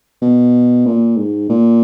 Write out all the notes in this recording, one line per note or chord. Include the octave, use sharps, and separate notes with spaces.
B2
A#2
G#2
A#2